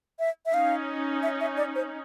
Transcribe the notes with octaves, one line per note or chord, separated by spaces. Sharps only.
E5
E5
C#4 D#4 F5
E5
E5
D5
C5